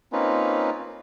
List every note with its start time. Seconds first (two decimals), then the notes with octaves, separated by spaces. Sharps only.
0.13 A#3 C4 C#4 D#4 F4 B4